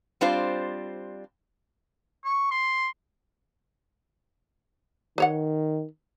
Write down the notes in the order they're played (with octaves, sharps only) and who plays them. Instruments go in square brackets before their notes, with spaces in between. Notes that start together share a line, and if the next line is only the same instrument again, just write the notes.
[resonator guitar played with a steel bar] G3 C4 D4 F4 C5
[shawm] C#6
C6
[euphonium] D#3 [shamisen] B4 C#5 F#5